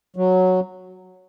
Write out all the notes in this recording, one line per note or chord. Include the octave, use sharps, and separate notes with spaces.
F#3